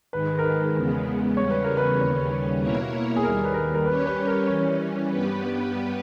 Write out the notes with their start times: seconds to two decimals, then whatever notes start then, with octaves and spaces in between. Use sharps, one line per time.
0.12 G#2 D#3 G#3 B4
0.39 A#4
0.44 B4
0.75 E2 C#3 G#3 B3
1.37 E2 C#3 G3 C#4 C#5
1.50 B4
1.64 A#4
1.77 B4
1.99 D#2 C#3 G3 C#4
2.61 B2 A#3 E4 A#4 C#5
3.16 G#4
3.23 D#2 D#3 G3 A#4
3.44 B4
3.54 A#4
3.75 A#4
3.86 G3 C#4 G4 B4 C#5
4.06 B4
4.27 A#4
4.47 E3 G3 C#4 C#5
5.10 G2 G3 B3 G4 B4